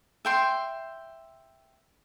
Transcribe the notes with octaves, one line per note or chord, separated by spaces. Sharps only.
E5 G5 C6